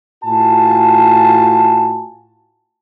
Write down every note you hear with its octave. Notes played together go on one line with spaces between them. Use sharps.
A2 F4 F#4 G#5 A5